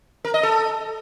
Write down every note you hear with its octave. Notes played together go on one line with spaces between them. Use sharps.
A#4
D#5
A4